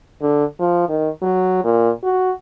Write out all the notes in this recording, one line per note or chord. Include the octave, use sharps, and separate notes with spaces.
D3
F3
D#3
F#3
A#2
F#4